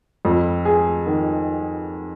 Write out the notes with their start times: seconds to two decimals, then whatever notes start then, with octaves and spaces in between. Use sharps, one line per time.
0.25 F2
0.65 G#4
1.07 D#3